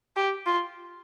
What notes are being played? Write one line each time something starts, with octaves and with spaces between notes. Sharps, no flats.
G4
F4